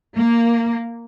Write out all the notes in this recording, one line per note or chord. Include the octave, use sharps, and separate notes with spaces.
A#3